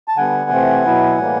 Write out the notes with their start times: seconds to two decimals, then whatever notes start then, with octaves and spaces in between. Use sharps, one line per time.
0.08 A5
0.17 D3 G3 B3 F#5 G#5
0.50 C3 E3 A3 C4
0.85 B2 F#3 B3 E4
1.18 A2 E3 G3 A#3